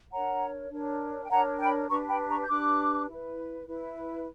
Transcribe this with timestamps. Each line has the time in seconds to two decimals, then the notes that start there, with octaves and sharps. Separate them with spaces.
0.12 D4 A#4 C#5 F#5 A#5
0.71 D4 A#4 C#5
1.24 G5
1.30 D4 A#4 C#5 F#5 A#5
1.60 G5 B5
1.90 D4 G4 B4 A#5 C#6
2.09 G5 B5
2.29 A#5 C#6
2.43 G6
2.48 D4 G4 B4 D6 F#6
3.09 E4 B4
3.67 E4 B4